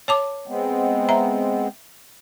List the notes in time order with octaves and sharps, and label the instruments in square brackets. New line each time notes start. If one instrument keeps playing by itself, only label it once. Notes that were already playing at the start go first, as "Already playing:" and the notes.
[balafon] C#5 A5 D6
[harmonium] G#3 B3 C4
[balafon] E5 A#5